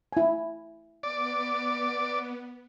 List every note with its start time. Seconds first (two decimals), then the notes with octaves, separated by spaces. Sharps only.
0.13 E4 G#5
1.03 B3 D5